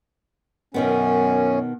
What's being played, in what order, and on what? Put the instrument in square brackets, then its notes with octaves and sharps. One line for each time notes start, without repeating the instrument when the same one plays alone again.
[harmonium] F#2 C#4 [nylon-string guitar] B2 D#3 B3